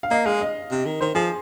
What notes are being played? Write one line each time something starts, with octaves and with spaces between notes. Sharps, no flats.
F5
A#3 D#5
G#3 F5
D#5
C3
D#3
D#3 C5
F3 G#4